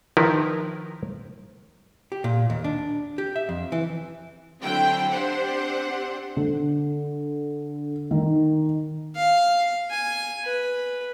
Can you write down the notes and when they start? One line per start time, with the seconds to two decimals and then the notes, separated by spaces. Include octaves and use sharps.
0.17 D#3 F3 E4 A#4 B4
2.12 G4
2.24 A#2
2.50 D#2
2.64 D4
3.18 G4
3.36 E5
3.49 F2
3.72 E3
4.62 D3 F#3 C4 E4 G5
5.10 C4 D4 G4 C5 F#5
6.37 D3
8.11 D#3
9.15 F5
9.90 G#5
10.44 B4